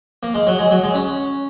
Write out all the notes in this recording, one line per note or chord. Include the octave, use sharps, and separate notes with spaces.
A#3
G#3
F#3
G#3
F#3
G#3
C#4